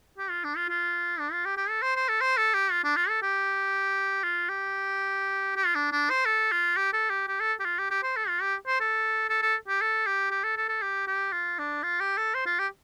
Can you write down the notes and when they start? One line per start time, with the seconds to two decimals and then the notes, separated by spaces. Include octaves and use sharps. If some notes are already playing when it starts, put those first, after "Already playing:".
0.18 G4
0.30 F4
0.44 D4
0.56 F4
0.69 F4
1.19 D4
1.32 F4
1.45 G4
1.57 G4
1.70 A4
1.82 C5
1.96 C5
2.09 A4
2.21 C5
2.37 A4
2.54 G4
2.71 F4
2.84 D4
2.96 F4
3.09 A4
3.22 G4
4.23 F4
4.49 G4
5.56 G4
5.66 F4
5.75 D4
5.92 D4
6.10 C5
6.26 A4
6.52 F4
6.77 G4
6.93 A4
7.10 G4
7.28 G4
7.40 A4
7.60 G4
7.65 F4
7.79 G4
7.91 G4
8.03 C5
8.17 A4
8.29 F4
8.42 G4
8.67 C5
8.80 A4
9.30 A4
9.42 A4
9.68 G4
9.81 A4
10.07 G4
10.31 G4
10.44 A4
10.57 A4
10.69 A4
10.82 G4
11.07 G4
11.32 F4
11.59 D4
11.83 F4
12.00 G4
12.17 A4
12.35 C5
12.46 F4
12.59 G4